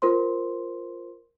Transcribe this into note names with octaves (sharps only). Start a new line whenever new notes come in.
F4 A#4 C5 C6